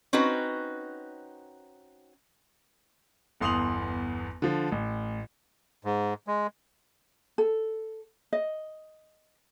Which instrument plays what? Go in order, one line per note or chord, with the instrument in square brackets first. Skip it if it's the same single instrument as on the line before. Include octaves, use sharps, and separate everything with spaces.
[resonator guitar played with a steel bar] C4 C#4 D#4 F#4 B4
[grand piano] G1 E2 C6 D#6 F7 F#7
D3 F3
A1
[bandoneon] G#2
G#3
[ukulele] A4
D#5